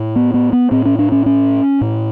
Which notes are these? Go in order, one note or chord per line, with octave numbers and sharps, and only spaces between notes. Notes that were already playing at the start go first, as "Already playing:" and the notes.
Already playing: A2
B3
B3
B3
A2 C4
C#4
D4
C#4
C#4
A2